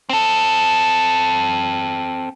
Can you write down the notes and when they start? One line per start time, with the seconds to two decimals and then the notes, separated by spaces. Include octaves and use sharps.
0.09 C4 A4